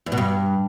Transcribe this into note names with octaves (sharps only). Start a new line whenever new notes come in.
E2
B2
G2